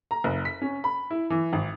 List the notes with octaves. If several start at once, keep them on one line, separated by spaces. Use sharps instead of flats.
A#5
F#1
B6
C#4
B5
E4
E3
G#1